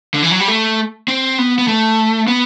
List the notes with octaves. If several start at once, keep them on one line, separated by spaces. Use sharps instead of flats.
D3
E3
F#3
G3
A3
C4
B3
B3
A3
B3